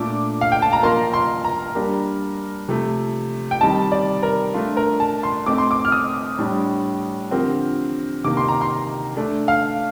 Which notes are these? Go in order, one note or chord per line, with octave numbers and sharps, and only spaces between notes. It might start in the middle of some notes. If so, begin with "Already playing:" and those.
Already playing: A#2 A3 D4 A4 D6
F5
G5
A5
A#5
F3 A#3 F4 A#4 C6
C6
A#5
G3 A#3 D4 G4 A#4
C3 F3 A3
G5
D#3 G3 C4 D#4 A5
D5
A#4
A3 D4 F4
A#4
A5
C6
A3 C4 D#4 D6
C6
D6
F6
D#6
A2 G3 D4
D3 F3 C4 G4 A#4
C3 D#3 A#3 D6
C6
A#5
C6
A3 D4 A4
F5